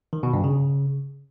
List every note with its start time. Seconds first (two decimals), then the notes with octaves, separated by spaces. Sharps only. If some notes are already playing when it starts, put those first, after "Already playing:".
0.13 D#3
0.23 B2
0.34 G2
0.44 C#3